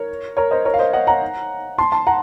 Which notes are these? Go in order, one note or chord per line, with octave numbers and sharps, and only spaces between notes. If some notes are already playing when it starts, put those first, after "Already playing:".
Already playing: A#4 C#5
A#4 C#5
C5 D#5
A#4 C#5
F5
C5 D#5
D#5 F#5
F#5 A#5
A5 C6
A5 C6
F#5 A#5